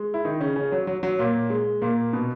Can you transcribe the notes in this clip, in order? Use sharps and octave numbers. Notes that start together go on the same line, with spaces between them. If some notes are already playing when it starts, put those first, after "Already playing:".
Already playing: G#3
E4
D#3 D#4
C#3 C#4
C#3 C#4
F#3
F#3
F#3
A#2 A#3
G#3
A#2 A#3
B2 B3